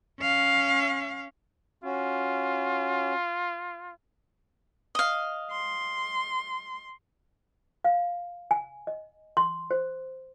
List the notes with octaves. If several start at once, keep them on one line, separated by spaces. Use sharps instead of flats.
C#4 F5
C#4 F4 F#4
D#5 F5
C6
F5
G#5
D#5
C6
C5